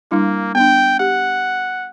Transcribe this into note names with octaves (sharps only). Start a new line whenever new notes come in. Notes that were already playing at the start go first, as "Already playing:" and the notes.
G3 A#3 D4 E4
B3 D4 G5
G4 F#5